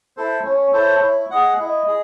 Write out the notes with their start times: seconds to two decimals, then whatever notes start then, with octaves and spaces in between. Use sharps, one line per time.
0.17 E4 A4 C5
0.45 C#4 C#5
0.73 E4 A4 C5
1.03 E4
1.31 G#4 D#5 F#5
1.60 E4 D#5
1.88 G#4